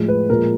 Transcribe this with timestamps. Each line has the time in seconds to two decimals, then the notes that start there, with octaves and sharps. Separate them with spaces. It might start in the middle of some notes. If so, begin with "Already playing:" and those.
Already playing: A2 F3 G#3
0.08 B4
0.29 A#2 F3 G#3 A#4